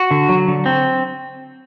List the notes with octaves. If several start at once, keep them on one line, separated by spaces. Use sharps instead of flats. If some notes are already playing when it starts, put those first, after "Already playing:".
Already playing: F#4
D3
F#3
D3
C4